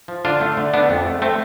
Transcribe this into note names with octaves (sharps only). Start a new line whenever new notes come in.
F3
D3 D4 F4
A3
D3
A3 B3 D4
F2
A3
A3 C4